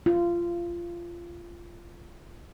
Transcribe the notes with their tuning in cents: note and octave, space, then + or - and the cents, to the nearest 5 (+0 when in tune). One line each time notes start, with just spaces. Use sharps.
F4 -20